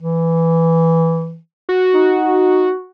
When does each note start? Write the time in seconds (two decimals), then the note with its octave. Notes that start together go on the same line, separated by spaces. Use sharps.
0.02 E3
1.69 F#4
1.94 D#4